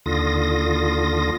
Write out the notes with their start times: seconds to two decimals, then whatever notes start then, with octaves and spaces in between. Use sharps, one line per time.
0.06 D#2 D3 F4 D#6 A#6